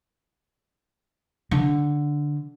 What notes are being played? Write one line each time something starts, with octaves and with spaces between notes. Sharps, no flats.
D3